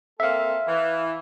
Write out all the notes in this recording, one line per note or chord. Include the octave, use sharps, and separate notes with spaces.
A#3 C4 A4 E5 F5
E3